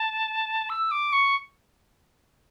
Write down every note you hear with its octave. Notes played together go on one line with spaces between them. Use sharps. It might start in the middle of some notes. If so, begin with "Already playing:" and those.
Already playing: A5
E6
D6
C#6